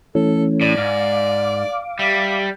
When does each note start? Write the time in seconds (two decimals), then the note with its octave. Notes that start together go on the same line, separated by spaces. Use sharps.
0.15 E3 A3 C#4 A4
0.61 A2 D5
0.77 G#2 F5 D6
1.99 G3 E5